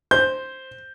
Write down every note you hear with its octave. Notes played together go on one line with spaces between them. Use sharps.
C5 G6